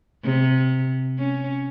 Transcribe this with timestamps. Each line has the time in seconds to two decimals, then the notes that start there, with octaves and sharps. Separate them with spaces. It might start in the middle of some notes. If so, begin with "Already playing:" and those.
0.23 C3
1.18 C#4